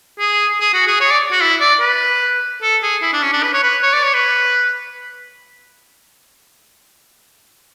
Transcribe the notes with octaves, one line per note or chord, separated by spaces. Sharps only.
G#4
G#4
F#4
G#4
C#5
D5
F#4
E4
D5
B4
A4
G#4
E4
D4
C#4
D4
B4
C#5
B4
C#5
D5
C#5
B4